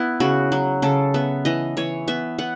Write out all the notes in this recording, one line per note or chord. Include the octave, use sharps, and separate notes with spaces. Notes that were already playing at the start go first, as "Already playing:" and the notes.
Already playing: B3 E4
C#3 F#4
F#3
C#3 A4
B3 E5
E3 D#5
E3 C#5
B3 E5
B3 F#5